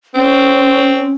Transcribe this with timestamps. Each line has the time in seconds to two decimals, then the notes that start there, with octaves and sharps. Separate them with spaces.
0.15 C4 C#4